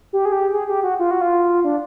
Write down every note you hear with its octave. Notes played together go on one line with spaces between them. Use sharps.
G4
G#4
G4
G#4
G4
F#4
F4
F#4
F4
D4